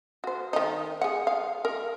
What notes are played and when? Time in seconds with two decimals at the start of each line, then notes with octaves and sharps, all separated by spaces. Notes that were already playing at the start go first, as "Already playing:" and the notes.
0.24 F#4 C5
0.53 D#3 D#4
1.01 G#4 F#5
1.27 F5
1.65 A#4